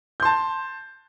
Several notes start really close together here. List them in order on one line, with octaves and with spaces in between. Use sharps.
G6 C6 A5